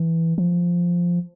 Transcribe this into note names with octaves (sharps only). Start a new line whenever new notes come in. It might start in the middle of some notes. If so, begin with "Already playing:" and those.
Already playing: E3
F3